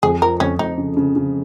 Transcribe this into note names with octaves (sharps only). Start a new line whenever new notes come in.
F2 G#4
F3 A#4
F2 C#4
F2 D#4
C#3
C#3
C#3